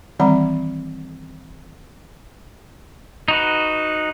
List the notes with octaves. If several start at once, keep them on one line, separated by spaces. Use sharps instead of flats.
D#3 E3 G3 C4 F#5 A#5
D#4 F#4 B4